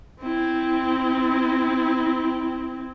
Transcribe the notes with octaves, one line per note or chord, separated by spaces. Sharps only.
C4 E4